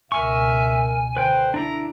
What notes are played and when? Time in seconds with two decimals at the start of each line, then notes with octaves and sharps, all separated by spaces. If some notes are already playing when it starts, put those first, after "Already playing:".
0.12 C#2 B2 A#4 E5 G#5 C#6
1.17 D3 B4 C5 G5
1.54 D4 E4 A#5